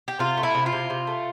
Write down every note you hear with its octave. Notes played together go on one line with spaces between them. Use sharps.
G4
C3 F4
A3
E4
C3
F4
C3
C3
A3